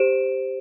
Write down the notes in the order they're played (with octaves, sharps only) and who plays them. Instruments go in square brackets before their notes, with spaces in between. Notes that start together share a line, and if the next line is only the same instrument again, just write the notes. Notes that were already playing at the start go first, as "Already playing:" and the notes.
Already playing: [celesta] G4 C5 D7 E7